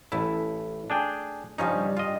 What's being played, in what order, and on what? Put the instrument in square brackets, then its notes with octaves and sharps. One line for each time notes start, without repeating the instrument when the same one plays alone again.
[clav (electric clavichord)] A1 E4 [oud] A3 C#4
[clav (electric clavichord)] D4 G#4 G5
[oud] G2 C#3 G3 [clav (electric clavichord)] F3 C#4 D#4
[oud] G2 [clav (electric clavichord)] F4 D#5